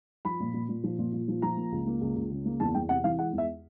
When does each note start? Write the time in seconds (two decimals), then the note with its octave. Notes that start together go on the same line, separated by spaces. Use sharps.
0.25 F3 B5
0.40 A#2
0.54 A#2
0.69 A#2
0.84 F3
0.98 A#2
1.13 A#2
1.28 F3
1.42 F3 A#5
1.57 A#3
1.72 C#2
1.87 A#3
2.01 C#2
2.16 C#2
2.31 C#3
2.45 A#3
2.60 E2 A5
2.75 E2 G5
2.89 C3 F#5
3.04 E3 F5
3.19 G#3 F#5
3.33 E2 E5